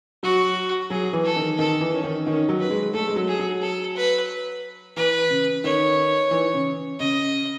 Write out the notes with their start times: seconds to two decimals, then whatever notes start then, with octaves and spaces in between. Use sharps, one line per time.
0.23 F#3 F#4
0.90 F#3 G#4
1.13 E3
1.24 A4
1.36 D#3
1.58 D#3 A4
1.81 E3
1.92 C#4
2.04 D#3
2.26 D#3 C#4
2.49 F#3
2.59 B4
2.70 G#3
2.93 A3 A4
3.07 G#3
3.16 F#3
3.27 G#4
3.39 F#3
3.61 A4
3.96 B4
4.96 E3 B4
5.30 C#3
5.64 D#3 C#5
6.31 E3
6.54 C#3
6.99 C#3 D#5